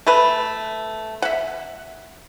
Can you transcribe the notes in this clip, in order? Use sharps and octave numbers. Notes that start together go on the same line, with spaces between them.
A3 B4
E5 F#5